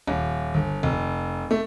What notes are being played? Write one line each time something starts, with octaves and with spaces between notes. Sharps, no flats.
D#1
G1
F1
A3